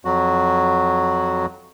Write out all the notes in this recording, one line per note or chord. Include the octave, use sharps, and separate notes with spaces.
F2 F#3 F#4